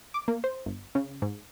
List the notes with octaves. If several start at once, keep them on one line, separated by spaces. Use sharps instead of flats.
D6
A#3
C5
G1
C#3
G#2